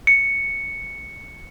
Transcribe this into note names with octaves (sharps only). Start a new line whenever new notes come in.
C#7